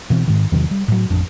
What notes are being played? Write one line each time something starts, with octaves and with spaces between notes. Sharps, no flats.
B2 E3 C4
G#2 D#3
E2 C3 D#3 F#3
G3
A2 F#3
A1 F2 D4